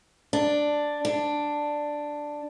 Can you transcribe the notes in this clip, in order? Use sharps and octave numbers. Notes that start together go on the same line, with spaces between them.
D4
D4